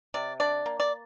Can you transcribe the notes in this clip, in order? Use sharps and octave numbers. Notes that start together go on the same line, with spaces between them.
C3 D5
D4 D5
A#3
D5